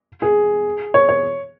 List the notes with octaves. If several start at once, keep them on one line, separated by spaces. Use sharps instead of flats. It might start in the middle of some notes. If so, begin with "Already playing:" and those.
G#4
C#5
C#5